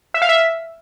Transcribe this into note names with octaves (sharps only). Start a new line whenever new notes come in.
E5
F5
E5